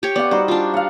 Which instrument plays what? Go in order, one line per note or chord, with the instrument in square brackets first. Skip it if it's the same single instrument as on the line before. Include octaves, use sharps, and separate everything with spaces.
[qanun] G4 C#5
[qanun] B3 [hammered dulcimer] D5 F#5
[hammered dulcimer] G3 D#4 F#4 [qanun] C5
[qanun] D4 F4
[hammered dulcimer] F5 F#5